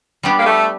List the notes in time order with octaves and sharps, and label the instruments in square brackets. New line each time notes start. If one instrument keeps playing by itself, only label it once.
[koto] G3 B3 D4 G4
[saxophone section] A#3
A3